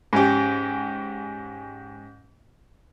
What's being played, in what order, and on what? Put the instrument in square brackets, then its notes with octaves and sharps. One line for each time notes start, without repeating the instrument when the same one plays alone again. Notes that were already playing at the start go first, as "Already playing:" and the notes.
[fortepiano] G#2 C#4 G4